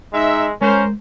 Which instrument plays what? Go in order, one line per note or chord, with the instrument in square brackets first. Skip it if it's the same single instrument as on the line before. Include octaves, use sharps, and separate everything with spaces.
[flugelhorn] G#3 [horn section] D#4 E5
[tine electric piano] G#3 [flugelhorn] C#4 [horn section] A#4 C5